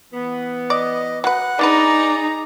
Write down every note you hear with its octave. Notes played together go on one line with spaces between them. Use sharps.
E3 B3
D5 D#5
F#3 B4 F#5 F#6
B3 D4 D#4 G#4 B4 D5 A#5